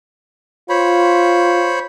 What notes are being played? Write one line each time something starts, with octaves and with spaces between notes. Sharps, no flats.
F4 C5 C#5 B5